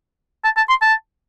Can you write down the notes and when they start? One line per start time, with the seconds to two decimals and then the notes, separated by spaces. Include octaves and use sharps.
0.44 A5
0.57 A5
0.69 C6
0.82 A5